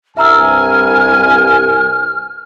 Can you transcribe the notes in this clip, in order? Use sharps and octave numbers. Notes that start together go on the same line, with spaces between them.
C2 G2 E5 G#5 A#5 E6 F6